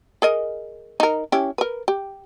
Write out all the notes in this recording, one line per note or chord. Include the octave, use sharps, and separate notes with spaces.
G#4 A#4 D#5
D#4 A#4
C#4 E4 G4
A#4 B4
G4